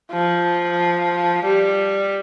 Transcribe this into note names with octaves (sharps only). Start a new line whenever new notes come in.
F3
G3